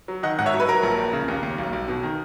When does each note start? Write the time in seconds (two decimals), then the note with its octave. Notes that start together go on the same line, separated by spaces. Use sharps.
0.08 F#3
0.23 D#3 D#5 F#5
0.39 G#2 F#5
0.46 C#5 E5
0.54 F#3
0.60 B4
0.68 F#3 A#4
0.83 A#1
0.98 A#1
1.13 C#3
1.28 D#2
1.43 D#2
1.58 B1
1.73 B1
1.88 B2
2.03 D#3